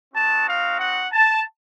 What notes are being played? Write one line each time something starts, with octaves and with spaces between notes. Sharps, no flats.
C4 D#4 F#4 A5
F5
F#5
A5